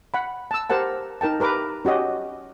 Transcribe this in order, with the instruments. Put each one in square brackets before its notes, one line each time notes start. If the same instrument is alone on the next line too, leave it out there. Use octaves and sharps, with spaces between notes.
[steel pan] F#5 B5
A5 E6
G4 A#4 C5 F#5 A5
D#4 A#4 G5 A5
G4 A#4 B4 D6
C#4 F#4 G4 D#5